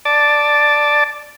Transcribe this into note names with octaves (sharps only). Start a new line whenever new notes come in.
D5 A5